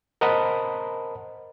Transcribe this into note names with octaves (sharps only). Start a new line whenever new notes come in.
A#4 C5 D#5 F#5 A5 B5